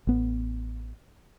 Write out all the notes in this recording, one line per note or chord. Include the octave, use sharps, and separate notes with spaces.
A1 B3